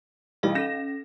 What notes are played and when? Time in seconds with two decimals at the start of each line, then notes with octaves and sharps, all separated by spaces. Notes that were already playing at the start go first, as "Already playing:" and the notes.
0.43 B1 E3 G3 D#5 F5
0.55 C#4 A4 A#6 E7